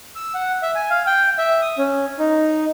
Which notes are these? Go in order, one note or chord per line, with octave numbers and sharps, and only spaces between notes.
E6
F#5
E5
G#5
F5
G5
E5
D#6
C#4
D#4